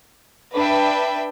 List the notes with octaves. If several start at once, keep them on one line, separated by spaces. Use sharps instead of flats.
D4 B4 E5 G5